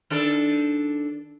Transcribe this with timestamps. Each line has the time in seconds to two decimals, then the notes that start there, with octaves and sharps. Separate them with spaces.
0.10 D#3 D4 A4